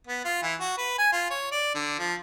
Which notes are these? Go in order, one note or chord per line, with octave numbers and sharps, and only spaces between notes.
B3
F4
E3
F#4
B4
G#5
F4
C#5
D5
D3
F3